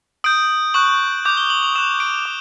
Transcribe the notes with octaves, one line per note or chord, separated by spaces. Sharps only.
D#6 G6 D7
C#6 F#6 F#7
D6 G6
G7
F#7
F7
D#6 F#6 E7
D7
D6